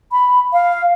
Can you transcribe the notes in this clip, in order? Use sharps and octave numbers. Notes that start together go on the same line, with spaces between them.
B5
F5